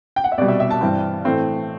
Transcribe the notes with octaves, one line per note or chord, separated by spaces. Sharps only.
G5
F#5
E5
C2 B2 G3 D5
E5
E5
A5
G2 E3 G3 C4
A2 E3 A3 C4